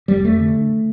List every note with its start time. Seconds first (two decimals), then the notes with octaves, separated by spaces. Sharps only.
0.08 F1 G3
0.24 F2 A3
0.39 D3
0.56 D3